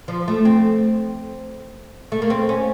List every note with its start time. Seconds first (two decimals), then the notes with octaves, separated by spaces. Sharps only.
0.08 F3
0.28 A3
0.45 C4
2.12 A3
2.22 A#3
2.30 C4
2.49 C#4